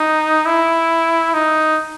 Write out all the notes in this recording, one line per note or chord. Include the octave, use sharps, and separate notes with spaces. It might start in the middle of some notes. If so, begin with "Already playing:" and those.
Already playing: D#4
E4
D#4